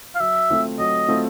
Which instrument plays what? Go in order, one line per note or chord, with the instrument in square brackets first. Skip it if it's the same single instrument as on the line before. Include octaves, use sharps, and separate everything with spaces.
[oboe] F5
[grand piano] F#3 [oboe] E5
[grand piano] A3 C4 F4
[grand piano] F#3 [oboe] D#5
[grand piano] A3 C4 F4